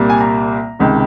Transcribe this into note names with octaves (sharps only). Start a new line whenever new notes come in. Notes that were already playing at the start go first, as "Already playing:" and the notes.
Already playing: C2 A#2 G3 A#3
G#5
A#5
C#2 C3 D#3